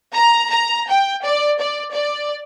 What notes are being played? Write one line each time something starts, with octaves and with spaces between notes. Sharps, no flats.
A#5
A#5
G5
D5
D5
D5